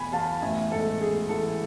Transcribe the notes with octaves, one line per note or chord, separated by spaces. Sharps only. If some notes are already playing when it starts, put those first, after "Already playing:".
Already playing: E2 B2 A3 G#5 B5
E2 F5 A5
A1 E5 G#5
G#2 A4
A1 G#4
E3 A4